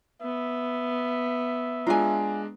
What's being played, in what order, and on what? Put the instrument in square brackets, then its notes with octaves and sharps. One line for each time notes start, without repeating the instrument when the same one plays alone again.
[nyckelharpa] B3 [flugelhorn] E5
[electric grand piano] G#3 D4 A#5 [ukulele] F4 G#5